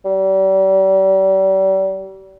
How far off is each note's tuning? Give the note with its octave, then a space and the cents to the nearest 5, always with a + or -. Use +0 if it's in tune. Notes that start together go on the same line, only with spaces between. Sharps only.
G3 -35